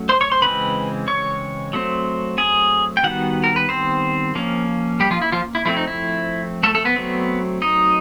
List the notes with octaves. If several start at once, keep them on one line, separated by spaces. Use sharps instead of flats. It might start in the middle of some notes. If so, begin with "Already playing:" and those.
Already playing: F#3 A3 C#4
C5 C6
C#5 C#6
C5 C6
C#3 E3 G#3 C4 B4 B5
C#5 C#6
F#3 A3 C4
G#4 G#5
G5
D#3 G3 B3 F#4 F#5
A#4
B4
C4 C5
F3 A#3 C#4
G3 G4
F3 F4
E4
F3 F4
E4
F3 A3 C4 E4
D#4
E4
A3 A4
A3 A4
B3 B4
F#3 A3 C4
D#4 D#5